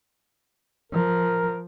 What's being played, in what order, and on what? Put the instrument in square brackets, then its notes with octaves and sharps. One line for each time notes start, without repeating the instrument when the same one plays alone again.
[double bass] F3 [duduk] A#4